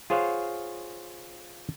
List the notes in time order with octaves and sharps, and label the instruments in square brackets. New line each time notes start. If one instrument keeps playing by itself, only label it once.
[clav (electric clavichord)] F4 G#4 C5 C#5 F5 F#5